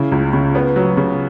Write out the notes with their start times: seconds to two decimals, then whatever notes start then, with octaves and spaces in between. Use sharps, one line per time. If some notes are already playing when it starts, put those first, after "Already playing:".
Already playing: C#3 E4
0.12 C#2
0.33 C#3
0.55 B3
0.76 F#3
0.97 C#3